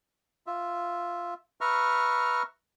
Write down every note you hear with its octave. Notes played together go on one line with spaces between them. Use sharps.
F4 E5
B4 E5 A#5 C#6 F6